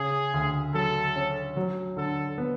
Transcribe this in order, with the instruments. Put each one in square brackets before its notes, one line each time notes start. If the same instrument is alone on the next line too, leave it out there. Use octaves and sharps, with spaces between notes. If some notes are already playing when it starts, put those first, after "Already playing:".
Already playing: [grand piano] C#3 [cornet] G#4
[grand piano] D2
[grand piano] F#3 [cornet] A4
[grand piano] C#4
F#3
[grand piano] D3 [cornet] A4
[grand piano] B3